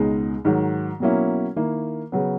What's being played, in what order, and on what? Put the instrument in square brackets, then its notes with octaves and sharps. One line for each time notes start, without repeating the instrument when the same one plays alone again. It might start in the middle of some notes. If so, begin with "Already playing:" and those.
Already playing: [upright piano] C#2 B2 G#3 D#4
G#2 D#3 F#3
B2 F#3 A#3 C#4 E4
D#3 A#3 E4
C#3 F#3 B3